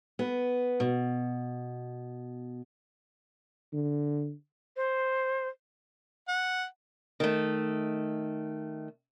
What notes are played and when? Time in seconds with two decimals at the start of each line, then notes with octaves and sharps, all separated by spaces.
0.19 B3
0.80 B2
3.73 D3
4.77 C5
6.28 F#5
7.20 D#3 A3